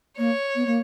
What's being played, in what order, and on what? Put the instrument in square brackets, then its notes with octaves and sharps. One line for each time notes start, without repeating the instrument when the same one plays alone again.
[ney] A#3 [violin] C#5
[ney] B3
A#3